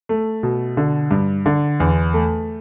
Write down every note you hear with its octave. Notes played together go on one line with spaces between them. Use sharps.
A3
B2
D3
G2
D3
E2
A3